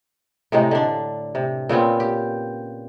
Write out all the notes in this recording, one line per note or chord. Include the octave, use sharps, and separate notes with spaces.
A2 C3 G#3 D#4
D3 D4
C3
A#2 C#3 B3 C4
G4